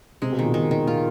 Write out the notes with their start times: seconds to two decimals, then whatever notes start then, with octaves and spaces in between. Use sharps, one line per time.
0.22 C3 G#3
0.32 B2
0.39 A#2 D#3
0.53 B2 D#3
0.71 D#3
0.87 A#2 F4